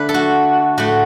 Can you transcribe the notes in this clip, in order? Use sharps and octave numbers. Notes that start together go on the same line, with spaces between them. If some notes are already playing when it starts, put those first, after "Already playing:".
Already playing: D3 A3 B4
A4
F#4
A2 A3 F#4